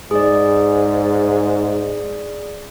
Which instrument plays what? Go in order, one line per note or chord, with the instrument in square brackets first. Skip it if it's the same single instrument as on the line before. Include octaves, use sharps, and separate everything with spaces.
[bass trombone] G#2 [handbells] G#4 D5